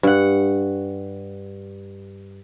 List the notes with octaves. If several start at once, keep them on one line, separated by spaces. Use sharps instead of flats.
G2 F#5